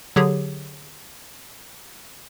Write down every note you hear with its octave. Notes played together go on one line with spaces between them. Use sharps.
D3 F#3 G4 G#4 C#5